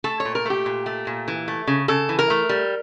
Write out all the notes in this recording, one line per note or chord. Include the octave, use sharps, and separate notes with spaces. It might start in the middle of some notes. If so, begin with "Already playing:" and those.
A3 A4
C#5
A#2
A#4
A3 G4
A#2
A3
A#2
E3
A3
C#3
C#3 A4
E3
A#4
A3
G3